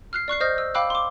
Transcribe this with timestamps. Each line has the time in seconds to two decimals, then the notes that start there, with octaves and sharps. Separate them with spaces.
0.13 F6 F#6 C7
0.28 D5 C#6 F#6 C7
0.40 C5 D#5 D#6 F6 G6 A#6
0.58 E6
0.74 F5 G5 B5 D6 E6 F#6
0.90 C6 D6